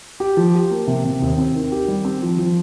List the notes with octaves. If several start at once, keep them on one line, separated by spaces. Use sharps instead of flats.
G4
F3
G4
A#3
C3
C3
D#2
C4
D#3
G4
G3
C4
F3
F3